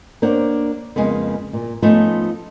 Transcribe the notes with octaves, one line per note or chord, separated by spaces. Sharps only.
A#3 D4 C5 C#5 F#5
F2 C#3 G#3 A#3 B3
A#2
F3 A3 B3 C#4 D#4 F4